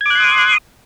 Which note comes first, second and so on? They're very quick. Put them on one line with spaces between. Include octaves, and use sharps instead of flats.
G#6 D6 F#6 C6 D#6